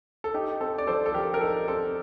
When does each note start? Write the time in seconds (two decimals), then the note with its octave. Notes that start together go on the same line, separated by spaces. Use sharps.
0.24 A4
0.34 D#4 G4
0.61 C4 A4
0.78 D5
0.87 F3 A4 C5
1.06 A4
1.14 F3 G4 A#4
1.34 A#4
1.41 D#4 A4
1.68 C4 A4